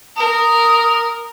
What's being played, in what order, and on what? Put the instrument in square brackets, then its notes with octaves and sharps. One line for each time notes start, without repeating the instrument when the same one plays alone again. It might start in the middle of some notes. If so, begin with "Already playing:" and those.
[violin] A#4 [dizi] D#6